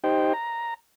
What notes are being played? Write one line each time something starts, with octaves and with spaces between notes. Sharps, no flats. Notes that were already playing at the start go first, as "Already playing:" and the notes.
D#4 G4 C5 G5
A#5